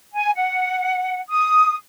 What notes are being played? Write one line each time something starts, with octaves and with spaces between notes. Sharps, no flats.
G#5
F#5
D#6